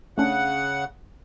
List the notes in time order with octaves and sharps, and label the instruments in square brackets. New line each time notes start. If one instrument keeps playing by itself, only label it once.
[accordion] C#3 F#5 [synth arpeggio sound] A3 C#4 D4